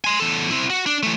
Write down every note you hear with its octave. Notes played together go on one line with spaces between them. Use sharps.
G#5 C6
E2 A4
C4 E4
F#4
D4
E3 A3